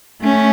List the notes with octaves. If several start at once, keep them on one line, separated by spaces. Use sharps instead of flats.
A3 C#4